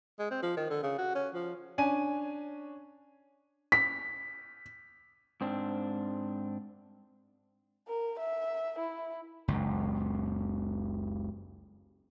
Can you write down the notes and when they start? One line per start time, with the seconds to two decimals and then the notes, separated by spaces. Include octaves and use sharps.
0.19 G#3
0.31 C4
0.43 F3
0.57 D#3
0.70 D3
0.83 C#3
0.98 F#4
1.15 C#4
1.34 F3
1.78 C#4 D4 G#5 D#7
3.72 B6
5.41 G#2 C4 D4
7.88 A#4
8.19 E5
8.79 E4
9.48 F#1 C#2